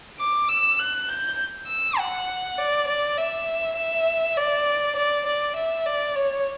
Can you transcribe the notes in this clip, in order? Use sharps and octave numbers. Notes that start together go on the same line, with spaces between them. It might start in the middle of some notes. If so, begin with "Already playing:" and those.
D6
E6
F#6
G6
E6
F#5
D5
D5
E5
E5
D5
D5
D5
E5
D5
C#5